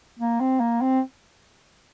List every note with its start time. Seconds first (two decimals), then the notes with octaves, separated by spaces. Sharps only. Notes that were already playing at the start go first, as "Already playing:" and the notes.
0.19 A#3
0.40 C4
0.60 A#3
0.81 C4